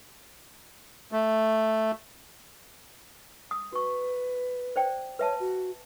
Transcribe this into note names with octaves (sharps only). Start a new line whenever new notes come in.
A3
D#6
F#4 B4 C#6
C5 D5 G5
B4 C#5 E5 A5
F#4